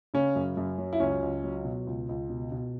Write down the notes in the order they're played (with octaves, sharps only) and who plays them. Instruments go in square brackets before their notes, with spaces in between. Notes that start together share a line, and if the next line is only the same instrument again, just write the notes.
[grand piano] C#3 C#4
F#2
F#2
F#3
E4
C#2 C#4
C#2
F#3
B2
C#2
C#2
B2
B2